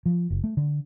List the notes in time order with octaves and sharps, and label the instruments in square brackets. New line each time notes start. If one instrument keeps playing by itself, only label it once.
[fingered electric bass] F3
F#1
A3
D3